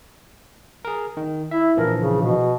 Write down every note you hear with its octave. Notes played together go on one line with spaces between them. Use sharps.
G#4 A#4
D#3
E4 E5
A#1 E3 F3 A#4
C#3
B2